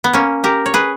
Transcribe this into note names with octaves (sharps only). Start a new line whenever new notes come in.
B3
A#3 C#4
G4 A#4
C#5
G#4 B4